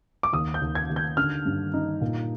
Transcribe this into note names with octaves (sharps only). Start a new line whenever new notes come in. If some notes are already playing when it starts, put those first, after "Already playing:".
D6
D#2 D#6
G6
D#2
G#6
D#2
G6
D3 F6
G2
D#4
A#2